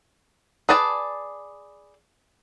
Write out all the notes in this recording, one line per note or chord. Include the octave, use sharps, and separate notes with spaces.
G#4 B4 D5 A5